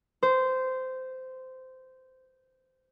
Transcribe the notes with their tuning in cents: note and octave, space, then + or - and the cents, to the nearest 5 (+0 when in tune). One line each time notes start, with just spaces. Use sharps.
C5 -15